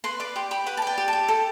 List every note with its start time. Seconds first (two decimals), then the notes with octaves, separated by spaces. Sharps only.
0.04 B4 C6
0.20 D5 D6
0.36 G4 C6
0.51 G4 B5
0.66 B4 F#5
0.77 A5
0.82 D5 G5
0.98 G4
1.08 A5
1.13 G4
1.28 A4